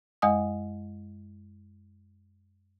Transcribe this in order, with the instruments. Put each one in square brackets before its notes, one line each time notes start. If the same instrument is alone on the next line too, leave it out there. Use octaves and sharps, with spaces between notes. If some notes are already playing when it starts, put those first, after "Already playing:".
[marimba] F#2 G#3 D#5 G#5 D#6